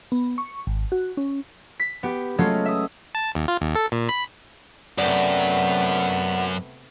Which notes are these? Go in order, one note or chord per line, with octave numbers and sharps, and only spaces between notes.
B3
C#6
G#1
F#4
C#4
B6
B3 G4
F#3 G#3 A3 B3 C#4 F4
E5 D#6
A5
D#2
F4
D#2
A4
A#2
B5
F#2 C3 A3 B3 D5 F#5 G5